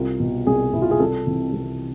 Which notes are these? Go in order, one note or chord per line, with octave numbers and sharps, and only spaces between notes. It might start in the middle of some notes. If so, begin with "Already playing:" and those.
Already playing: C2 F4
B2
C2 G#4
B2 E4
F4
G#4
C2 A4
C3 E3
C2